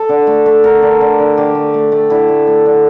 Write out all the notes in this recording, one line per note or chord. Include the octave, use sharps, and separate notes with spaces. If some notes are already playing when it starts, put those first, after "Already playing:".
Already playing: A4
D3
A3
A3
D3 A#4
D3
D3
D3
D3 G4
A3
A3
A3
D3 E4
A3
A3
D3